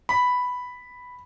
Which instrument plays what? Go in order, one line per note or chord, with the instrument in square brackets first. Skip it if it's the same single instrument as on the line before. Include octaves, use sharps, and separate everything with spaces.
[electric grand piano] B5